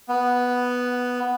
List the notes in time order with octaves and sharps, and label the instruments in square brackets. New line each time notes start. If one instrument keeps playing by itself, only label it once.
[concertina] B3